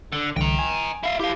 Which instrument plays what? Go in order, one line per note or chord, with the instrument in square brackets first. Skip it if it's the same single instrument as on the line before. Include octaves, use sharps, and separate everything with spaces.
[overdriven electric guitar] D3
[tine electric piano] C2 D3 E3 [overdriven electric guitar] G5 A#5
[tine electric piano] G#5
[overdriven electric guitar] E4 F5
[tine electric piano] E4 [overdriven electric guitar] G4 F5